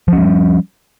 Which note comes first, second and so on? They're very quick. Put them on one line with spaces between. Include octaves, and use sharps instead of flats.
F3 C#4 G#3 G3